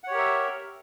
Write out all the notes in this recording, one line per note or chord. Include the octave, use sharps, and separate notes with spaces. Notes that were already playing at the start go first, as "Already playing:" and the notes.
G4 A#4 C#5 E5 F#5